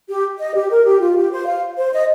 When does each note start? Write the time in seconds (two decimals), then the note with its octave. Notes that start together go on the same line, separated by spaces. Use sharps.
0.09 G4
0.39 D#5
0.55 G4
0.70 A#4
0.85 G4
1.00 F4
1.16 G4
1.31 C5
1.46 F5
1.77 C5
1.93 D#5